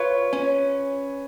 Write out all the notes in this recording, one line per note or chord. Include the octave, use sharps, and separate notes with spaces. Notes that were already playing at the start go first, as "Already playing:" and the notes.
Already playing: F4 B4 C#5
C#4